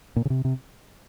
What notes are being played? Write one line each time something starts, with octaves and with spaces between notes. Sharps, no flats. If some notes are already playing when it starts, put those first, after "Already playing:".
A#2
C#3
C3
C3